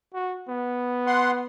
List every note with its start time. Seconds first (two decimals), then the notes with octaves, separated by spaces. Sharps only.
0.14 F#4
0.48 B3
1.07 F#5 C6